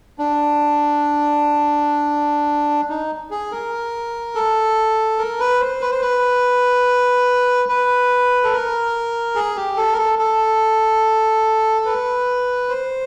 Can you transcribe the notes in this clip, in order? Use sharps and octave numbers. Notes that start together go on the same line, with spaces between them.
D4
D#4
G#4
A#4
A4
A#4
B4
C5
B4
C5
B4
B4
A4
A#4
G#4
G4
A4
A#4
A4
A4
B4
C5